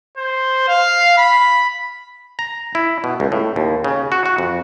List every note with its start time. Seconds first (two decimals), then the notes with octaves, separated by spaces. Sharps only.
0.17 C5
0.68 F5
1.18 B5
2.39 A#5
2.75 E4
3.04 B2
3.20 C#2
3.32 A2
3.56 D#2
3.84 C#3
4.12 F#4
4.26 F#4
4.38 F2